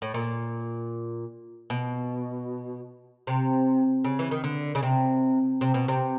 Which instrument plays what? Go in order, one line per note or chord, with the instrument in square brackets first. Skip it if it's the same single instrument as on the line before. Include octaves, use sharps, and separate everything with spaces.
[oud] A2
A#2
B2
C3
C#3
E3
D#3
D3
C#3
C3
C3
B2
C3